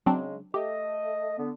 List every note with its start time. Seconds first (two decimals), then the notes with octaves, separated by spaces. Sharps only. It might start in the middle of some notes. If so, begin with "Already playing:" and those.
0.06 C#3 F#3 G#3 C4 D4
0.54 A3 G4 D#5
1.37 D3 B3